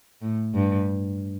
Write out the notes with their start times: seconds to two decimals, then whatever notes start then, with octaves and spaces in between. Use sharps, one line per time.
0.22 A2
0.54 G2